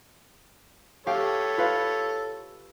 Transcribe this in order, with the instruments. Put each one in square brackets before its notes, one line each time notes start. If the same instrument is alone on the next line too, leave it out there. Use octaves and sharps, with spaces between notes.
[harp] G4 F5 [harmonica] A4 C#5
[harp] F4 B4 F5